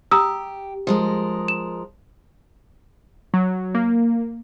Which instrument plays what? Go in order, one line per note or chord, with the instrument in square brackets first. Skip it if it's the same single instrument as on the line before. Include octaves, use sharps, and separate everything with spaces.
[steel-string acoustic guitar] G4 [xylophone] A#5 D#6 E6
[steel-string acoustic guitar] F3 G#3 A#4
[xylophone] E7
[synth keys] F#3
A#3